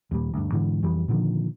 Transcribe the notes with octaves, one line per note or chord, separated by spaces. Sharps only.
D#2 A#2 G3
D2 G2
G#2 D3 E3
F2 E3 G3
A#2 D3 D#3 F3